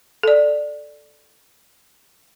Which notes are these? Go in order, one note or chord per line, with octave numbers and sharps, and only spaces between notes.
A4 D5